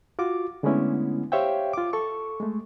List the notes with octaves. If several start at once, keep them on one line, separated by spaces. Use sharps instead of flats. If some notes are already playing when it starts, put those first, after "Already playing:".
F4 F#4 D6
D3 G#3 A3 B3 C#4 E4
G4 C5 C#5 E5 F5 G5
F4 D6
A4 C#6
G#3 A3